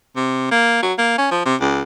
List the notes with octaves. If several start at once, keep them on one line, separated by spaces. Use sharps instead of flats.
C3
A#3
F#3
A#3
C#4
F3
C3
C#2